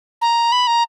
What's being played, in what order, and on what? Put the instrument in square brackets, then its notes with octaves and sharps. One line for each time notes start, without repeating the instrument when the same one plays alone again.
[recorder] A#5
B5
A#5